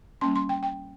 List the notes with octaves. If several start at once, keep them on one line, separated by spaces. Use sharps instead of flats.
G3 A#3 C#4 C6
C6
G5
G5